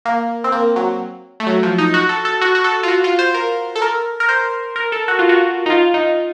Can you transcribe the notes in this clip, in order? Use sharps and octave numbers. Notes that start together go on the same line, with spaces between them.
A#3
C4
A#3
F#3
A3
F#3
F3
D#4
F#4
A4
A4
F#4
F#4
A4
F4
F#4
F4
C5
A#4
A4
A#4
A#4
C5
A#4
A4
F#4
F4
F#4
D#4
F4
D#4